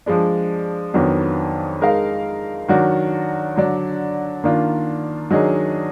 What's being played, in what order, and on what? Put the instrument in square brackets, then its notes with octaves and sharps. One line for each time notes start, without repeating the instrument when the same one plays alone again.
[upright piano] F3 G#3 D4
F2 D#3 F#3 B3 D4
G#3 D#4 A#4 F5
D#3 F#3 D4 F#4 D5
D3 F#3 D4
D#3 A#3 D4 F4
D#3 F#3 D4 G#4 D#5